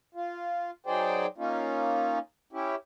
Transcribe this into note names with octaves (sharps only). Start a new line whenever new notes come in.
F4
F#3 D#4 G#4 C5 D5 G5
A#3 C#4 D#4 F4
C#4 E4 G4